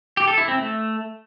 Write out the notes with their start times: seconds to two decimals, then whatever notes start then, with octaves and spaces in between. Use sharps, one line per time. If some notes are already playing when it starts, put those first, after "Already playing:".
0.17 G4
0.28 A4
0.38 E4
0.48 C4
0.58 A3